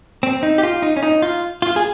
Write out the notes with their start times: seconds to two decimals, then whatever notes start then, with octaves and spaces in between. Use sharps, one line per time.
0.23 C4
0.43 D#4
0.58 G4
0.63 F4
0.82 D#4
0.96 C#4
1.03 D#4
1.22 F4
1.62 F4
1.76 G#4